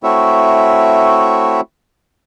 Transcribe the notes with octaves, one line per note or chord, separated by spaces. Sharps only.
A3 C4 E4 F#4 C#5 E5